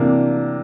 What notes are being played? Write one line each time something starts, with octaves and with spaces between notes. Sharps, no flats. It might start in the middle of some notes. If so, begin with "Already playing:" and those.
Already playing: C3 E3 A#3 D4